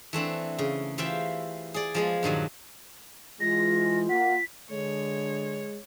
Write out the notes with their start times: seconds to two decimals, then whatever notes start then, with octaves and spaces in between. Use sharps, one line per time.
0.13 E3 A3 C4 D4
0.59 C#3
0.98 E3 F4 G4 C5 E5 G5
1.74 G#4 D5
1.95 F3 G#3 B3
2.23 G2 A#2 D#3 F#3
3.41 E3 G#3 F4 A#6
4.10 A#3 F#5 B6
4.71 D3 G#3 C#5